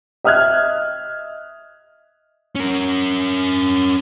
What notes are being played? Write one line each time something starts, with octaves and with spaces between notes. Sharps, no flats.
D#5 E5 D#6 F6 F#6 G#6
C#4 A#4